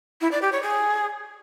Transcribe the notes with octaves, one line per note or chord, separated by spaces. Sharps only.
E4
D5
G4
C#5
G#4